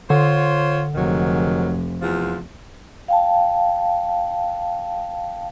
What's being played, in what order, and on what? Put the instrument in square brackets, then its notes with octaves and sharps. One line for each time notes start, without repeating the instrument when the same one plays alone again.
[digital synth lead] D3 [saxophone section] F4 C5 C#5
[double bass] F1 [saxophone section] G#2 D#3 F#3
[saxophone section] E2 F3
[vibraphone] F5 G5 A5